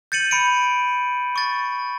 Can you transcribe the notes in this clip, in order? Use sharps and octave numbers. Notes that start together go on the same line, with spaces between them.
G6 A6 C#7 D#7 F#7
B5 C#7 D7
C#6 A6